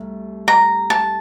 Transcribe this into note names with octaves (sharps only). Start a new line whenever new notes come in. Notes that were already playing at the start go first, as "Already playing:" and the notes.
Already playing: C2 A3
A#5
A5